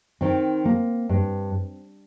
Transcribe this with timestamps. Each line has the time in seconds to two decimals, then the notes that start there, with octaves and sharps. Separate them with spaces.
0.21 D#3 C4
0.65 A#3
1.09 G2